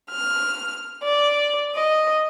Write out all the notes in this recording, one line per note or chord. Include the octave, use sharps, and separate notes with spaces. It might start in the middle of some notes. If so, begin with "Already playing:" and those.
F6
D5
D#5